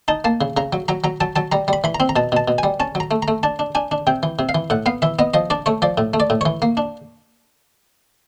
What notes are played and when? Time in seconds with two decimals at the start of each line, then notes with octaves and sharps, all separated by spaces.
0.08 D#4 A5
0.24 A#3 A5
0.41 C#3
0.57 C#3 A#5
0.73 F#3
0.88 F#3 A#5
1.04 F#3 A#5
1.21 F#3 A5
1.36 F#3 A5
1.52 G3 A#5
1.68 G3 B5
1.84 E3 B5
1.95 A#5
2.00 C4
2.09 A#5
2.16 B2 A5
2.32 B2 A5
2.48 B2
2.58 G3 G#5
2.80 C#4 A5
2.95 F#3
3.00 A#5
3.11 A3
3.22 A#5
3.28 A3
3.43 D4 A5
3.59 D4
3.75 D4 G#5
3.92 D4
4.07 C3 G5
4.23 E3
4.39 C3
4.49 F5
4.55 E3
4.70 A2 F#5
4.86 B3 F5
5.02 E3 E5
5.19 B3 D#5
5.34 F3 D#5
5.50 D4 D5
5.66 A3 C#5
5.82 F3 D5
5.98 A2
6.14 A3
6.20 D5
6.30 A2
6.41 E3 C#5
6.62 A#3
6.77 D4